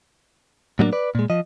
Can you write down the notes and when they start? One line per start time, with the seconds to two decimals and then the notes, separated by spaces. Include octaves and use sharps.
0.79 A2 F#3 G3 A#3 D4
0.93 B4 D5
1.15 A#2 G#3
1.30 F3 D#5